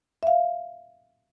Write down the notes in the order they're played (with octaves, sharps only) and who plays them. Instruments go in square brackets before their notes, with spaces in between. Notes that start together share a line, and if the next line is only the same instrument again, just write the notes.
[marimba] E5 F5